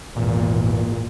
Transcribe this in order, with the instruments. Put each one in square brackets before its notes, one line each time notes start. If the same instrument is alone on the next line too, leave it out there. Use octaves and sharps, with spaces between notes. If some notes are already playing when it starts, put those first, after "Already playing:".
[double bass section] G#1 E2 [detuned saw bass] A#2